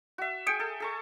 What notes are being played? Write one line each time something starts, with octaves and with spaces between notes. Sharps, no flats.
F#4 E5
G#4 G5 G#5 D#6 C#7 D7
A4
G#4 A4 C#6